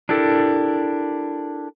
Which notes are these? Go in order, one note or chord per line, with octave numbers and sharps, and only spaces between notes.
D4 E4 G4 A4 A#4